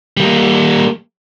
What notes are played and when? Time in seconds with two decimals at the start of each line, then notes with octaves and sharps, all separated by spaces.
0.17 G3 A#3